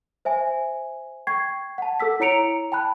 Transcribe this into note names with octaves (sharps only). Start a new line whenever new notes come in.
C5 E5 G#5
G5 C#6 G#6 C7
F#5 A5
A4 F#5 E6 B6
E4 C#5 A#5 C#7 D7 F7
G5 A5 B5 F#6